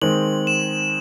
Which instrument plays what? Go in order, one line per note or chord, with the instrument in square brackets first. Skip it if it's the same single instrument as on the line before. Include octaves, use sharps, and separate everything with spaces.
[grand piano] D#3 G#3 C4 [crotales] F#7
[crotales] E7